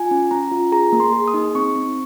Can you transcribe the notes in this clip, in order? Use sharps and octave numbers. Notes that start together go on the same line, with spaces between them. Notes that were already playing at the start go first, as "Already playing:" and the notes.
Already playing: F4 G#5
C#4
C#4 A#5
F4
G#4 A#5
A#3
C6
G#4
D#6
D#4
C4 C#6
C4